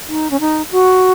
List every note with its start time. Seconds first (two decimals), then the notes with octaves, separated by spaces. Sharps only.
0.08 D#4
0.31 C#4
0.40 D#4
0.72 F#4